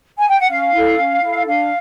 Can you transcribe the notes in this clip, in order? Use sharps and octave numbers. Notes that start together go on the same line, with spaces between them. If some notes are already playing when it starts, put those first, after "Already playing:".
G#5
G5
F#5
C#4 F5
E4 A4
C#4
E4 A4
D4 F5